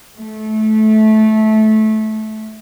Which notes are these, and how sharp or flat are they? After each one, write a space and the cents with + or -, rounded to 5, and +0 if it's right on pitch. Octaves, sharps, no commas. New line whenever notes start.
A3 -20